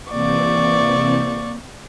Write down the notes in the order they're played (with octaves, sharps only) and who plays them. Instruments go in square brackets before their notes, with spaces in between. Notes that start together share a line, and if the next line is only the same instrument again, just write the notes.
[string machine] C3 E3 C4 [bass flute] A#3 [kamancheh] D5 C#6